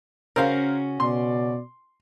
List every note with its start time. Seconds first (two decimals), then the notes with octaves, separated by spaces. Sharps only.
0.36 C#3 C#4 F#4 A#4 C5 F5
1.00 B2 D5 C6